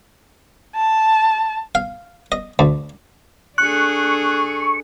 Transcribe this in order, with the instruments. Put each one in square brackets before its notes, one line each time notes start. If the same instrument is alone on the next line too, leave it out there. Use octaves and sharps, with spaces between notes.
[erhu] A5
[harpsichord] F5
D#5
D2
[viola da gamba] D4 G#4 A4 [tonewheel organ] C#6 [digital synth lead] F#6